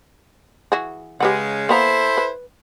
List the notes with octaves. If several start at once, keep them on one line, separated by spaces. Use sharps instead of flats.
E3 F#4 G#4
C#3 G#3 G4 B4 F#5
A#3 B3 E4 A4 C5 A#5
B4